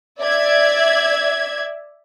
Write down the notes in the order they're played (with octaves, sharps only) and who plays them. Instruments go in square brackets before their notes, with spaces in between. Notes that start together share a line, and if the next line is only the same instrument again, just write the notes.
[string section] D5 E5 G#6